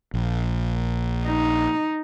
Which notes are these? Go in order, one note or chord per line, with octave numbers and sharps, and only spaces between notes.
A#1
D#4